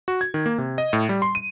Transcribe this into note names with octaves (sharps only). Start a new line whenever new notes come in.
F#4
G#6
D#3
A#3
C3
D#5
A2
G3
C6
D#7